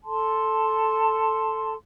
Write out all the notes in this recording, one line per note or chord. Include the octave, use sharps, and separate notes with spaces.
A4 A5 C6